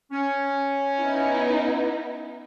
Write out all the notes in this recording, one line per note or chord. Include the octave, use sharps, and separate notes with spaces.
C#4
B3 D#4 E4